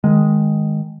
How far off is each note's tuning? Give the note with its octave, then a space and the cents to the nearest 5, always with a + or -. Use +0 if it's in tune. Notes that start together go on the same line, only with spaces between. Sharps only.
D#3 +0 G#3 +0